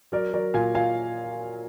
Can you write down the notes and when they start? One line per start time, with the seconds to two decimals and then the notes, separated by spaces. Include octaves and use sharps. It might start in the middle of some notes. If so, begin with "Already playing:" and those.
0.12 F#3 A#4 D5
0.33 F#3 A#4 D5
0.54 A#2 F5 G#5
0.75 A#2 F5 G#5